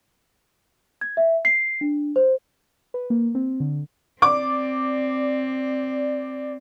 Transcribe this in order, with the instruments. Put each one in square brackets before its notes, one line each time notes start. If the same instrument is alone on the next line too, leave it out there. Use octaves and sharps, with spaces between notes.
[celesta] G#6
E5
C7
D4
C5
[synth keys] B4
A#3
C4
D3
[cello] C4 [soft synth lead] D5 [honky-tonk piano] D6